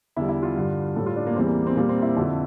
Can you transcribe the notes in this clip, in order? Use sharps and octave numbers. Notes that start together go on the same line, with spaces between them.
E2 D3 G3 E4
E4
F4
G2 D3 G3
A2 G3 A4
F4
D4
A#3
E2 E3 G3 C4
A#3
C4
A#2 G3 A#3
C4
E4
F2 D3 F3